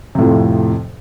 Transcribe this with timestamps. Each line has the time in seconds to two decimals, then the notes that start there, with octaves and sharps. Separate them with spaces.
0.15 C3
0.18 A2
0.22 F3
0.25 F2